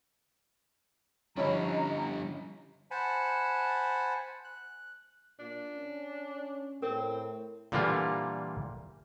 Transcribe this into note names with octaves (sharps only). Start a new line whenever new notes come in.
D3 F3 G3 C#4 E4 D#5 A#5
C5 F#5 G#5 A5 B5
F#6
A#2 D4
C#4
A2 C4 A#4
A#2 D3 E3 G3 A#3 F4